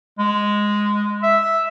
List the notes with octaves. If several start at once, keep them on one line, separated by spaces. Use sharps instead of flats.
G#3
E5